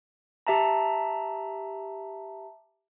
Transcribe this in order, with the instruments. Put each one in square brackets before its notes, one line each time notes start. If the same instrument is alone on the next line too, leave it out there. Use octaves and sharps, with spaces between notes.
[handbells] G4 E5 A5 A#5